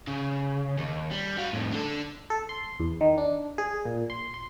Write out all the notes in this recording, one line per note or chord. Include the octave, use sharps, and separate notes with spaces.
C#3
D#2
G3
F#4 F5
F2 A2
D3 A4
A4
C6
E2
D#3
D4
G#4
A#2
C6
C6